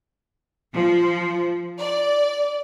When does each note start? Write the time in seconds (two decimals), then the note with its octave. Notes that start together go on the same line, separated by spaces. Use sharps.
0.73 F3
1.79 D5